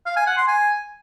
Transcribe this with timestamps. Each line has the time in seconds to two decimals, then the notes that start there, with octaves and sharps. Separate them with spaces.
0.06 F5
0.17 G#5
0.27 F#5
0.37 C6
0.47 G#5